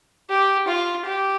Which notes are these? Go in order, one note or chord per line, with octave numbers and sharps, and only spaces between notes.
G4
F4
G4